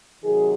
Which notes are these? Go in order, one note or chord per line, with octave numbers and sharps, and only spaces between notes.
C3 D#3 F#3 G#4